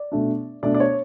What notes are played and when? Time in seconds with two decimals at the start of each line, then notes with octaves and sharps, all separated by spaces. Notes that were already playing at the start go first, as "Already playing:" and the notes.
Already playing: D5
0.12 B2 A3 D4
0.63 B2 A3 D4 D5
0.75 D5
0.80 C#5